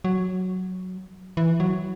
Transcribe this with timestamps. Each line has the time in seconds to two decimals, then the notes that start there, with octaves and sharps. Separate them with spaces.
0.04 F#3
1.37 E3
1.60 F#3